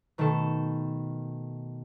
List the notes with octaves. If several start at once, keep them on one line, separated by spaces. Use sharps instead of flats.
B2 D#3 A3 B3 A4 E7